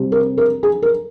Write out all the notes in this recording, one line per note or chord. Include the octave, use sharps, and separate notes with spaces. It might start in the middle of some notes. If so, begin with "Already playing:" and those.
Already playing: C3 G3 C4
A#4
A#4
G#4
A#4